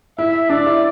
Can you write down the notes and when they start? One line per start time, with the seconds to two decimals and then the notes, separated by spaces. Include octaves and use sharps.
0.18 E4 E5
0.49 D4 D5
0.66 E4